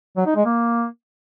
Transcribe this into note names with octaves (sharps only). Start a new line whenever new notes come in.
F#3
D#4
G#3
A#3